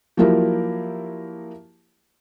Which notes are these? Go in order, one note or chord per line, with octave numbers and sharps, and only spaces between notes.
F3 F#3 A#3 E4 G4 A#4